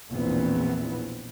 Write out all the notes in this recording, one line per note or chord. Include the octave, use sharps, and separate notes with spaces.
A#1 E2 B2 E3 B3 C4